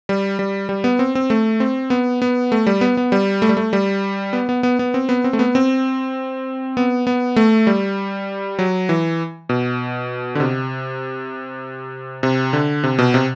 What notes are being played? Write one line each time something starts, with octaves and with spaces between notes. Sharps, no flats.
G3
G3
G3
B3
C4
C4
A3
C4
B3
B3
A3
G3
B3
B3
G3
A3
G3
A3
G3
B3
B3
B3
B3
C4
B3
C4
A3
B3
C4
B3
B3
A3
G3
F#3
E3
B2
D3
C3
C3
D3
C3
B2
C3